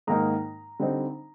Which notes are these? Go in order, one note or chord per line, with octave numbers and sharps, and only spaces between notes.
G#2 D#3 A#3 D#4 A#5
D3 G3 C4 D#4